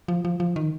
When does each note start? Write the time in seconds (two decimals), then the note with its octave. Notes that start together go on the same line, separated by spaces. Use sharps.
0.08 F3
0.25 F3
0.40 F3
0.56 D#3